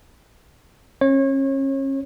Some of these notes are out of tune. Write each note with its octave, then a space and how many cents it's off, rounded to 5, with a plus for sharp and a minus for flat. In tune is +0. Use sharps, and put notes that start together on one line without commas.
C#4 -35 C#5 -30